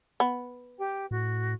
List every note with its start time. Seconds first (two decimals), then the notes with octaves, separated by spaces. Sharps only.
0.20 B3
0.78 G4 G5
1.11 A2 F#4